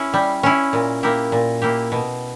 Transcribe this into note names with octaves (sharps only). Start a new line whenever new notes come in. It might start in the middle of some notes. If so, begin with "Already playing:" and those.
Already playing: C#4 E4
G3
C#4 E4
A#2
A#3 E4 G4
A#2
A#3 E4 G4
B2